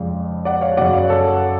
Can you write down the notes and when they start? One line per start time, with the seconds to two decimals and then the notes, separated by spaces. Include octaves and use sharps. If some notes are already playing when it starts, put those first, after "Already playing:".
Already playing: F2 C#3 F3 G#3 D5 F5
0.45 D5 F#5
0.61 C#5 F5
0.77 F#2 C#3 F#3 D5 F#5
0.94 C#5 F5
1.09 A4 C#5